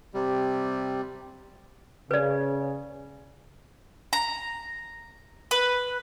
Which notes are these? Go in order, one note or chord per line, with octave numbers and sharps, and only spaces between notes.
C3 G3
C#3 B4 D5
A#5
B4